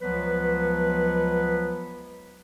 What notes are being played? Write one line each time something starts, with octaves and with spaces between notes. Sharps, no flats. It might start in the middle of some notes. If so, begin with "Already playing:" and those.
C#2 F3 F#3 B3 B4